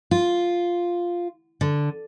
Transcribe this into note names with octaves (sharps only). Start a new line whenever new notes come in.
F4
D3